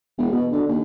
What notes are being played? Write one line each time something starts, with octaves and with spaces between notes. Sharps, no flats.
E1
B2
D3
D#2